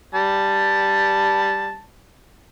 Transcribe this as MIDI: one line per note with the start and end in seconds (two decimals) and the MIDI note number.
0.15 1.82 55
0.15 1.82 81